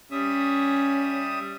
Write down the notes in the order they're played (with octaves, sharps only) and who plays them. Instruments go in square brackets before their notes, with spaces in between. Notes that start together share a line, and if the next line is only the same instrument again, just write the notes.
[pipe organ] G3 E5 D#6 [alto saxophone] C#4